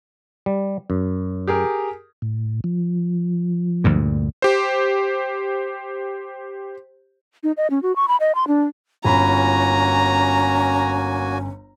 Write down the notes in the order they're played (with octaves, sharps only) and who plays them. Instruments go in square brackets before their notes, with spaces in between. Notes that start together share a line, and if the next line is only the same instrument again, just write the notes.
[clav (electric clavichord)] G3
F#2
[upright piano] G4 G#4 A#4
[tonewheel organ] A2
F3
[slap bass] D2 G2 A#2
[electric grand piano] G4 C5
[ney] D#4
D#5
C#4
F#4
C#6
B5
D#5
C6
D4
[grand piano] G1 B5 [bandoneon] A#3 F#4 G#5 [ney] C#4 [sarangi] A#5